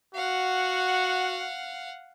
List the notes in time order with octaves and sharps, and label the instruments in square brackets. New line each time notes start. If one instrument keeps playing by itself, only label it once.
[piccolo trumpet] F#4 [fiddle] F5 F#5